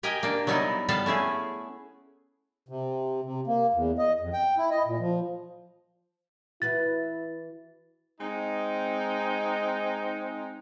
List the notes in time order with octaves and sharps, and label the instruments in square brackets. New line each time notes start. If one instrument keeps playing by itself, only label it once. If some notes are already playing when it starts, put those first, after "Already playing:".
[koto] G4 A#4 D#5 G5 G#5
A#3 D4
F#3 G3 B3 D#4 E4
G3 B3 A4 B4 F5 A5
A3 C#4 E4 G#4
[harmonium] C3
C3
A#3
E2
D#5
F2
G5
E4
D#5
A#2
F3
[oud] E3 F#4 B4 [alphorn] E4 [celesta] A6
[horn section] G#3 C4 D#4